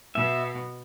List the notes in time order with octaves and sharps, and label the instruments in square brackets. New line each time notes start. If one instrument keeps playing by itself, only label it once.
[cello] B2 [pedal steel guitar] E5